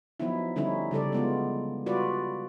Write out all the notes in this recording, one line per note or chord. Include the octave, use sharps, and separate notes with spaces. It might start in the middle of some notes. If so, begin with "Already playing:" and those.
F3 F#3 B3 D#4 E4
D3 G3 C#4 D#4 E4
C#3 G3 A4 D5
G#3 B3 F4
G3 F4 F#4 B4 D5